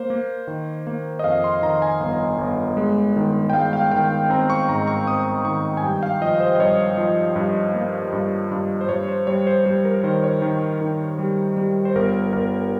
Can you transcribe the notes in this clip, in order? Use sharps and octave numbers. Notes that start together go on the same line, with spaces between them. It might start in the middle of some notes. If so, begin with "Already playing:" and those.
Already playing: A#3 C5
A#3
D#3
A#3
D#5
F2 F5
C6
D#3 A#5
G#5
G1
G1
G#3
D#3
G5
G#3 F5
F5
D#3 G5
C4 A#5
C#6
G#2 A#5
C#6
C4 D#6
D#3 C#6
G#5
G2 G5
F5
F3 D#5
C5
D#5
G2 C#5
F3
G2
A#3
G2
G2
C5
G2 C#5
C5
G3 C#5
C5
G3 C5
A#4
D#3 C5
C#5
D#3
D#3
G3
G3
C5
G1 A#4
G1 A#4